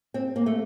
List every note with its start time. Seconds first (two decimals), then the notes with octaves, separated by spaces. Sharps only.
0.14 C4
0.36 A#3
0.46 A3